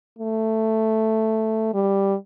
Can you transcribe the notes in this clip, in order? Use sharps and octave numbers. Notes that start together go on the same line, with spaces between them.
A3
G3